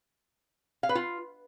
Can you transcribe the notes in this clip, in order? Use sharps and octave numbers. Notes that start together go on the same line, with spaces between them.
F5
B4
F4